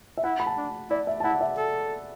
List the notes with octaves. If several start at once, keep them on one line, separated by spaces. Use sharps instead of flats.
E5
E4 F#5
B5
A5
D4
E4 D5
E5
A5
E4 F#5
E5
A4